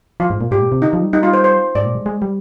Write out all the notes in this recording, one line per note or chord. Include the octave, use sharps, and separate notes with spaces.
F3 F4
G#2
A#2
G#2 G4
A#2
C3
D3 D#4
F3
G3
G3 D#4
F4
C5
C5
G#2 D5
A#2
G#3
G#3
G3